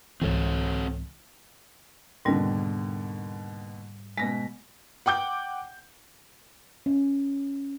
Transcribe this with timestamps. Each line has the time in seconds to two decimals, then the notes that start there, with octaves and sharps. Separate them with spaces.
0.22 C2 G#2 E3 C4 A4 C#5
2.25 D#2 G#2 B2 D3 G3
4.18 B2 G#3 A#6 B6
5.06 F#5 G5 D6 G6
6.86 C#4